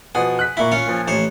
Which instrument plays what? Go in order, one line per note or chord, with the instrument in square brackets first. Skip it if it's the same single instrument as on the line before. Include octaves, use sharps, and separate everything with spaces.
[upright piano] B2 F3 F#5 [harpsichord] G#4
[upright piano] F#6 B6
[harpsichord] A#2 E4 [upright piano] C#6 B6
[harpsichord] C#4 F4 C#5
[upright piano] A#2 F3
[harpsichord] A1 C5 C#5